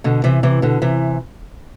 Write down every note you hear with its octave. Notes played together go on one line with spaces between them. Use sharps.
B2 D3
C3 E3
C3 E3
B2 D3
C3 E3